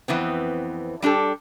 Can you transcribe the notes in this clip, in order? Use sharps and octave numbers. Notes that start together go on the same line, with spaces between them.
F2 E3 B3 C4
G3 D4 G4 A4